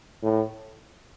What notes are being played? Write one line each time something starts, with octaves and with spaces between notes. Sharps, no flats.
A2